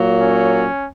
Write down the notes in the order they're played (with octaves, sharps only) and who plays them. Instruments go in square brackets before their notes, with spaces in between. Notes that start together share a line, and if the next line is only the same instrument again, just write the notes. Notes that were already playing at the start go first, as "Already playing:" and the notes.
Already playing: [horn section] A#2 F#3 A#3
C#4